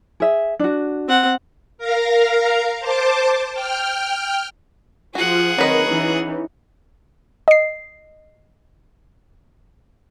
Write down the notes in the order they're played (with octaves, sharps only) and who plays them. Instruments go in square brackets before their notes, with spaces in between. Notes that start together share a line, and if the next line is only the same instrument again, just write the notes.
[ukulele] G#4 E5
D4 F#4
[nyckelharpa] C4 F#5
[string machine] A#4 F5 A#5
C5 A5 D6
G5 F6
[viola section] F3 F4 [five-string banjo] F#4 [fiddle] G#4 F#5
[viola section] D#3 C4 A#4 [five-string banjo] F#3 B4 D#5
[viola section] E3 C#4 D#4
[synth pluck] D#5 C7